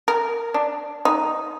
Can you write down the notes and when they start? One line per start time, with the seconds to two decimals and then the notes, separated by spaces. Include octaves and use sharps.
0.08 A#4
0.54 D4
1.05 D#4